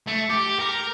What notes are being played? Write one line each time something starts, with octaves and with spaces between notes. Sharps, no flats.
A3
G4
A#4